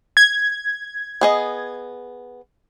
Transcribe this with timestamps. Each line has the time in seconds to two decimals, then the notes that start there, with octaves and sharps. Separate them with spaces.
0.17 G#6
1.21 B3 G#4 D#5